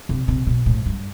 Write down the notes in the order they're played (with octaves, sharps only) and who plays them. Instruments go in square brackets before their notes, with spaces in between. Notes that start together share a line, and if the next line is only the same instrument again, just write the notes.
[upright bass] C3
C3
B2
A2
G2